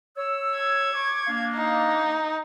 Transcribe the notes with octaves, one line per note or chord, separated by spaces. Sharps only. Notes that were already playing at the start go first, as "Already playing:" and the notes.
C#5 E6
G#6
C#6 D6
A#3 D4 F5
D#4